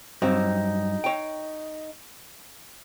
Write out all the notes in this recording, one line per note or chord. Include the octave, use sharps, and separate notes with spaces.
G2 F#3 C4 D#4
C#5 G5